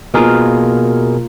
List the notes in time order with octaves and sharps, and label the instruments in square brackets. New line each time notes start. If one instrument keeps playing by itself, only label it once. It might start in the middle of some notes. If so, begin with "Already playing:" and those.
[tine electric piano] B2 G#4 A#4 [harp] A#3 F4